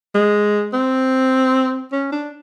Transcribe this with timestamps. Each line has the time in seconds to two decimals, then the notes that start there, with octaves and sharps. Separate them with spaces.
0.14 G#3
0.74 C4
1.92 C#4
2.12 D4